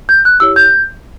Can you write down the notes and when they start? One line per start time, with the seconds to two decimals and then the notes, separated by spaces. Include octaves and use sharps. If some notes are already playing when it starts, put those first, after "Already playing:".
0.09 G6
0.25 F#6
0.40 E4 G4 C#5 E6
0.56 G6